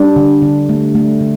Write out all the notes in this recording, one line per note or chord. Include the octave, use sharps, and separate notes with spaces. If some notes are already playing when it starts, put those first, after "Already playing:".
Already playing: G3 D4
D3
D3
A3
A3
D3